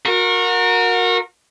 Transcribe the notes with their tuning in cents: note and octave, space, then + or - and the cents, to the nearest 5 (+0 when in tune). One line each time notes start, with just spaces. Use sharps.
F#4 -30 A#4 +0